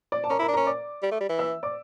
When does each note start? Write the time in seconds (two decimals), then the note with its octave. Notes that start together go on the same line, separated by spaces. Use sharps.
0.12 D5 D6
0.24 A5
0.30 C#4 A#4 A#5
0.39 E4
0.42 A#4 A#5
0.48 D4
0.54 C#4 A#4 A#5
0.66 D5 D6
1.03 G3
1.11 A3
1.21 G3
1.29 E3
1.39 E5 E6
1.63 D5 D6